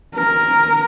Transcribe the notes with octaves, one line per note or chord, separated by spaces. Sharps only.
A#4